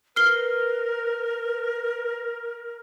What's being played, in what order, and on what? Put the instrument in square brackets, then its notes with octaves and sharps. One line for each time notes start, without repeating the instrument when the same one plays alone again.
[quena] A#4 [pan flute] B4 [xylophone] F6 C7 G7